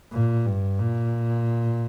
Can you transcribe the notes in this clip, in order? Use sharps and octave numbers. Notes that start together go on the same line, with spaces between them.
A#2
G2
A#2